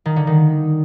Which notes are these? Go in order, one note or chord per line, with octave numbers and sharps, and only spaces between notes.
D#3
D3
D#3